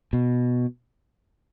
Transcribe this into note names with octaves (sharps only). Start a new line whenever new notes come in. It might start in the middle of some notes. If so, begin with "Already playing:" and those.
B2